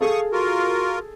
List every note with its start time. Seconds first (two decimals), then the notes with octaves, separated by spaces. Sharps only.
0.01 G#4 A4 F5 C#6 D#6
0.32 F4 F#4 A#4